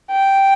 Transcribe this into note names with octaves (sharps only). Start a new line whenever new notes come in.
G5